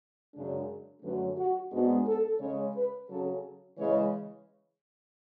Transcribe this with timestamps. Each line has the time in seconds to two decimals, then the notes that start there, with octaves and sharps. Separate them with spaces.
0.34 F#2 C#3 G#3 D4
1.03 F#2 D3 F#3 A3 C#4 B4
1.37 F#4
1.72 G#2 G#3 B3 D4 F#4
2.07 A4
2.40 C#3 G#3 C#4 C#5
2.75 B4
3.09 C#3 F#3 C#4 A4
3.78 C#3 E3 G#3 C#5